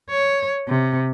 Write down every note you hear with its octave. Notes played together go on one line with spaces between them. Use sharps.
C#5
C3